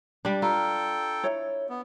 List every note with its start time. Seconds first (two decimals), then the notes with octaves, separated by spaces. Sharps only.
0.25 G3 D4 B5
0.42 F4 A4 G5 A#5
1.23 E4 C#5
1.70 B3